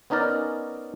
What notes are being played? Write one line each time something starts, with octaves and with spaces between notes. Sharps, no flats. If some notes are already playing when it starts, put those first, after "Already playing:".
B3 C#4 D#4 A#4 D5